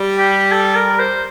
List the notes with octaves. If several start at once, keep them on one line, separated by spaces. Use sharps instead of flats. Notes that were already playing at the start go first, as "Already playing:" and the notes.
Already playing: G3
G4
A4
A#4
C5